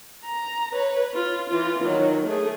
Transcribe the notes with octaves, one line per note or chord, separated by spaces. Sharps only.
A#5
B4 C#5
F4
E3 F4
D#3 F#3
A3 G#4